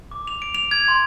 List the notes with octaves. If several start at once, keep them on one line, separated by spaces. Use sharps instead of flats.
D6
F7
D7
F7
G#6
C6